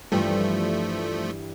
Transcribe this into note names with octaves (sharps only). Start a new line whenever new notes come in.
G2 E3 F3 G3 A3